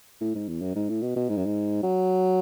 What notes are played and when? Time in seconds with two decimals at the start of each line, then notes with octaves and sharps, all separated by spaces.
0.21 A2
0.35 G#2
0.49 E2
0.62 F#2
0.75 G#2
0.89 A2
1.02 B2
1.16 B2
1.29 G#2
1.37 F#2
1.46 G#2
1.83 F#3